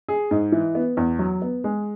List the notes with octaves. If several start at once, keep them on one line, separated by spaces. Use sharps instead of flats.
G#4
G#2
E3
B3
E2
F#3
B3
G#3